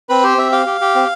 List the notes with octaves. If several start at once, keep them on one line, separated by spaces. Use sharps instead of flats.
C4 B4
G4 C5
C4 E5
G4 F5
G4
G4
C4